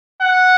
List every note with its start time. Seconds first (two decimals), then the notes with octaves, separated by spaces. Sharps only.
0.22 F#5